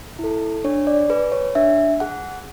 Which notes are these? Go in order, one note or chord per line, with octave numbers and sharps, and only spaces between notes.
E4 A4
D4 C#5
D5
G#4 B4
C#5
D4 E5
G#4 F#5